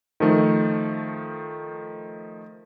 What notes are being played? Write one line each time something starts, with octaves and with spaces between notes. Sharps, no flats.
D#3 F3 A3